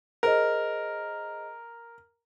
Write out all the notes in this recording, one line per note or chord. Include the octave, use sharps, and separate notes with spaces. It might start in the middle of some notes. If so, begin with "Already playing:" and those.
G#4 A#4 C5 D#5